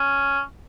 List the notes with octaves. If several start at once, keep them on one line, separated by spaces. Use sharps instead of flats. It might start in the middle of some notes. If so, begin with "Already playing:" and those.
Already playing: C#4